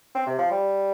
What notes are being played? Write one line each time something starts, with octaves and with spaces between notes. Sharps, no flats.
C4
C3
F3
G3